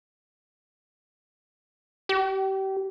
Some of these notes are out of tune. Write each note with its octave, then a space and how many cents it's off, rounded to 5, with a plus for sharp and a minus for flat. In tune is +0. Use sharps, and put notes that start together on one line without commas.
G4 -30